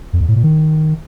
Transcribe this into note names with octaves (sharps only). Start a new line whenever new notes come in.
F2
E2
A2
A#2
D#3